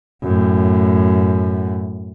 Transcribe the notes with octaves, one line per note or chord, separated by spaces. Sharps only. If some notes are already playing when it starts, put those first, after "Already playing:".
F#2 A2